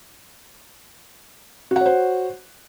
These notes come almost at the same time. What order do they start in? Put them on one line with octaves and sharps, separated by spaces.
F#4 F#5 C#5 C5